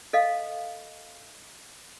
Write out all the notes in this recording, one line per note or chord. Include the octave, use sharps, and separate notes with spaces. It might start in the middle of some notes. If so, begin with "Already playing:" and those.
A4 D#5 F5